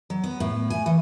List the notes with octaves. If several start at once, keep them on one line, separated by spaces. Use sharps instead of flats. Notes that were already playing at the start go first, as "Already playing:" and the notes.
F#3
B3
A2
G#5
E3